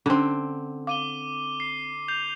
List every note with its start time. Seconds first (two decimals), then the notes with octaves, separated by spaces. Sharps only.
0.06 D3 C4 C#4
0.87 F5 D6 D#7 G7
1.60 C7
2.08 G6 C7 F7